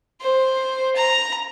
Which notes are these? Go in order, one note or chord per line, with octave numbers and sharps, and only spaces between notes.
C5
A#5